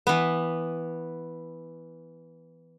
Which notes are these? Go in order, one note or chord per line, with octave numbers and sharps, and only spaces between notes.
E3 B3